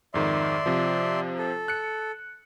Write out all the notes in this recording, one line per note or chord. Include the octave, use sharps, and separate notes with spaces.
F2 G#2 D#3 D5 E5 C6
C3 F3
A4
F#6 C#7